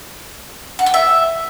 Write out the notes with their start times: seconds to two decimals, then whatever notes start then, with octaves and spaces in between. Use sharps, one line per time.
0.79 F#5
0.86 G5
0.94 E5